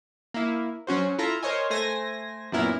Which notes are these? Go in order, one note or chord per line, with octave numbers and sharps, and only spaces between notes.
A#3 E4
F#3 C#4 F#4 C5
E4 F4 A4 E5 A#5
A#4 C5 C#5 D#5 G#5
A3 C5 G#5 A#6
F#2 A#2 B3 E4 A#4